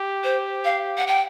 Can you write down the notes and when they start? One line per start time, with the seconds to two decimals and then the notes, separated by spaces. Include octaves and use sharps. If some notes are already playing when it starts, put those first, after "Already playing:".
Already playing: G4
0.24 C5
0.65 F5
0.98 F#5
1.07 G5